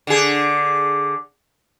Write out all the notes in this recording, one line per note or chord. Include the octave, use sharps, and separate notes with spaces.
D3 G#4